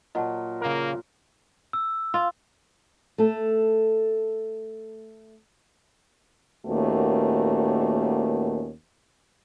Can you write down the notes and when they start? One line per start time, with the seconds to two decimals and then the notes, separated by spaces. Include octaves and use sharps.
0.15 A#2 F#3 D#5 F#5 A5
0.61 C#3 A#3 A#4
1.73 E6
2.14 F4
3.18 A3 A4
6.66 D#2 A#2 A3 B3 C#4 F#4